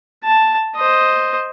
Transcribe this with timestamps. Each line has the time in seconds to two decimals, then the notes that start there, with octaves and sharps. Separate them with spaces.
0.25 A5
0.76 C5 D#5